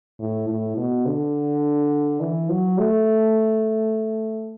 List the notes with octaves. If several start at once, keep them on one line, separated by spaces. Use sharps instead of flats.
A2
A2
B2
D3
E3
F#3
A3